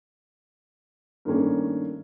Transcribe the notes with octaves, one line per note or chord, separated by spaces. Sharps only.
G2 D#3 A3 A#3 C#4